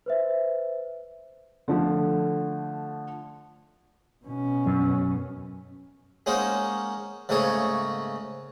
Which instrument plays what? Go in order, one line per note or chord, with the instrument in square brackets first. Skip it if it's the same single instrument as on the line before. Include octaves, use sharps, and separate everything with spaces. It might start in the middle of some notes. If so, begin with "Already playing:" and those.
[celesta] B4 C5 E5
[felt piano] D3 F3 A3
[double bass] B2 C#4
[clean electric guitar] F#2
[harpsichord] G#3 A#3 C#4 D#4 C5 F#5
G#2 C#3 A3 A#3 G#4 C#5